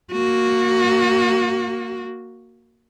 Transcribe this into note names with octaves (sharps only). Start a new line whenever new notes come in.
A#3 F#4